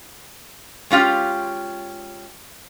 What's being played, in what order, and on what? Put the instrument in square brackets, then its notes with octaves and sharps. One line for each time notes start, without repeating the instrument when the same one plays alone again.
[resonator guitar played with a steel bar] G#3 C#4 F4 G4